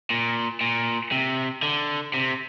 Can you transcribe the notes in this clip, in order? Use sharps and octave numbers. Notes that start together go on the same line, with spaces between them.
A#2
A#2
C3
D3
C3